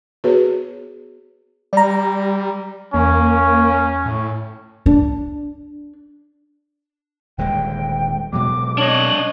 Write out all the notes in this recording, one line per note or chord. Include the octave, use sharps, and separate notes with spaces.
B3 F#4 G#4 B4 C#5
G3 D5 A#5
E2 A#3 C#4
A2
D4
D#1 D3 G#3 G5
B2 F#3 G#3 D6
D4 C#5 D#5 F#7